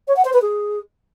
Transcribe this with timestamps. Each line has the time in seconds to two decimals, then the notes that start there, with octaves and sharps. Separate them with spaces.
0.08 C#5
0.16 F#5
0.25 C5
0.33 B4
0.42 G#4